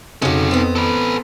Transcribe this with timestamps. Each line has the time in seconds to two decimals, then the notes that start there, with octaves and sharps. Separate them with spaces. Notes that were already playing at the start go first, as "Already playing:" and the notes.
0.22 F2 C#3 D#4 F#4 A4
0.51 B3 C4
0.76 A4 B4